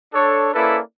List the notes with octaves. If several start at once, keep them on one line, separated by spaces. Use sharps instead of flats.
D4 A4 C#5
A#3 C#4 E4 A4 B4 D5